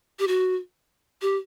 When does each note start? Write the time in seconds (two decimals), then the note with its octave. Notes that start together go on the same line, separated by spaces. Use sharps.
0.19 G4
0.28 F#4
1.22 G4